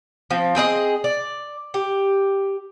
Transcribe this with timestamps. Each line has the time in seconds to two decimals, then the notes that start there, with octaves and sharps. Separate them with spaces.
0.31 F3 C4
0.55 C4 G#4 B4 D#5
1.04 D5
1.74 G4